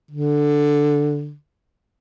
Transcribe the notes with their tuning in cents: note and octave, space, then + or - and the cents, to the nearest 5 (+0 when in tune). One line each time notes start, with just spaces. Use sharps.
D3 +0